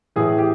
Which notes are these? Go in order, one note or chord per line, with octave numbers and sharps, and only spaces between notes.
A2 E3 G#4
G4